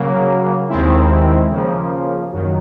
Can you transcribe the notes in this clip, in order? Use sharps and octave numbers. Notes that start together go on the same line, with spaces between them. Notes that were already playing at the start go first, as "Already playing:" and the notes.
Already playing: C#3 F#3 A#3
D#2 D#3 G#3 C4 E4
C#3 F3 A#3
F#2 D#3 F#3